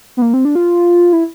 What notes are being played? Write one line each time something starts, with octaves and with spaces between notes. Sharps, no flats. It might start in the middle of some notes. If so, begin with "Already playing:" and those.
B3
A#3
C4
D4
F4
E4